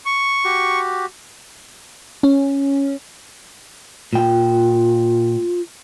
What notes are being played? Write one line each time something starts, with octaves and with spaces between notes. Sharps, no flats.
C#6
F#4 G4
C#4
A#2 F4 G5